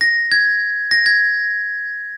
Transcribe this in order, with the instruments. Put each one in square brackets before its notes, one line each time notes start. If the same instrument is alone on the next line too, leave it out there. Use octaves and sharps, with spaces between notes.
[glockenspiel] A#6
G#6
A#6
G#6